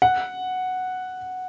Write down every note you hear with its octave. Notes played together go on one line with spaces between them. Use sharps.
F#5